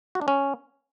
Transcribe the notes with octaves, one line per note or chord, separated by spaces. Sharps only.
F#4
D4
C#4